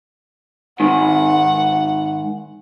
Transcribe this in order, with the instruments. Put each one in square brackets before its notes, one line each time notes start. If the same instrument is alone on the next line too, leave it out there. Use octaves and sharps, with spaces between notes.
[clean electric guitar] G#2 D#3 [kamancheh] F#5